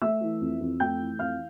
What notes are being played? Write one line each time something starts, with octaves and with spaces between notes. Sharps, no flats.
A3 E5 E6
E3
F2
F2
A3 G5 G6
E3
F2 F5 F6